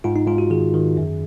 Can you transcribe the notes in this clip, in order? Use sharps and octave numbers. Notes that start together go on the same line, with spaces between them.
G#2 F4
D#4
G#2 F4
F#4
D#3 G#4
D#3
F#2